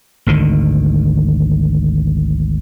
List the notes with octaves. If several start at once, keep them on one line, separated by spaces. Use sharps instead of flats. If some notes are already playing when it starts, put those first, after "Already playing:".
G#1 D2 D3 D#3